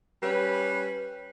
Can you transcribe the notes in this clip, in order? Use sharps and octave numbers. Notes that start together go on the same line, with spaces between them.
G3 C#4 B4